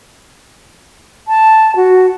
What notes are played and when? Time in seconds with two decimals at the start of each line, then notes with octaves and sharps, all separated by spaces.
1.28 A5
1.76 F#4